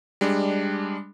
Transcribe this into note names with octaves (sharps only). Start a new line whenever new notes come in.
G3 G#3 D4